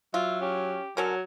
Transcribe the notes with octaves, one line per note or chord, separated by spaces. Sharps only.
F#3 F4 E5
C#4 G4
D3 F#3 C#4 A4 A#4